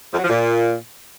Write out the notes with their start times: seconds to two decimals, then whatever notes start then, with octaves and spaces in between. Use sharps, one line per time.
0.13 F2
0.19 F#3
0.24 F3
0.29 A#2